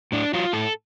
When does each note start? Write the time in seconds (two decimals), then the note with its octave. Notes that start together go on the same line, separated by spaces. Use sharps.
0.12 A2 D4
0.33 F#3 F4
0.53 A2 A4